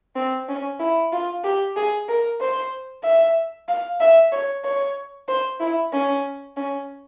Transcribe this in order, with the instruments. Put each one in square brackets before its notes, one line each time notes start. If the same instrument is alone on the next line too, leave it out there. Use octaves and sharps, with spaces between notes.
[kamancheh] C4
C#4
E4
F4
G4
G#4
A#4
C5
E5
F5
E5
C#5
C#5
C5
E4
C#4
C#4